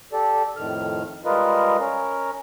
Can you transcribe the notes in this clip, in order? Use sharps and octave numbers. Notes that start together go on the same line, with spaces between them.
G4 A4 D5
F2 A2 D#3 F6
G3 G#3 F4 A#4 B4 D#5
C#4 A#4